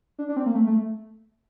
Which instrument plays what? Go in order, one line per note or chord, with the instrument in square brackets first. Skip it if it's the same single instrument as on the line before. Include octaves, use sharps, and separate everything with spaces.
[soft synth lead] D4
D4
C4
A#3
A3
A3